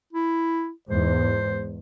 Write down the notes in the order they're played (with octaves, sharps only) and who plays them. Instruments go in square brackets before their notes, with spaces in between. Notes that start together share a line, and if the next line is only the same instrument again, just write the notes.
[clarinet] E4
[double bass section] E2 G#2 [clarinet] C5